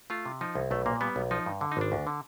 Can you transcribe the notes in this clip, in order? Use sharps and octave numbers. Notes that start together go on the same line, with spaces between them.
A3 F4
C3
F3 D#4
C2
B1 A3
A#2 A#3
G3 B3
B1
F3 D#4
G2
D3
D#4
G#1 D4
D2
D3